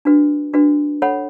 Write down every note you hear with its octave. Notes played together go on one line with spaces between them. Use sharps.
D4 F#4 B4
D4 F#4 B4
A4 C#5 F#5 B5